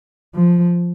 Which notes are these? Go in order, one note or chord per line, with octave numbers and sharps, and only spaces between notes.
F3